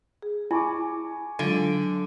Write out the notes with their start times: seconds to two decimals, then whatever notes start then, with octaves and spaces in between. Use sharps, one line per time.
0.22 G#4
0.51 E4 G#5 B5 C#6 D6
1.39 D3 F#3 G#3 F4